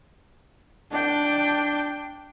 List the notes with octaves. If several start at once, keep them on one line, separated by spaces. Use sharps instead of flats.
D4 G5